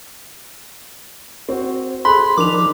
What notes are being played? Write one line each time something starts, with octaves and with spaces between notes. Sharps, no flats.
C4 F#4
G#4 A4 B5 C6 F#6
D#3 F3 D4 D#4 A#4 D6 F7